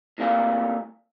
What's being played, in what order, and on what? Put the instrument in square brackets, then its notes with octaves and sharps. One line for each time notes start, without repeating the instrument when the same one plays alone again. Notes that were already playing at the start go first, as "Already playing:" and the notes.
[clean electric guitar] A2 C3 G3 A#3 F5